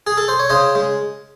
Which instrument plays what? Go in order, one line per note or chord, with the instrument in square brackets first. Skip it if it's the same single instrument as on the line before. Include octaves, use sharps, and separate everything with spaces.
[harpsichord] G#4
A4
C5
C#5
C#3 C5 D#5
G#3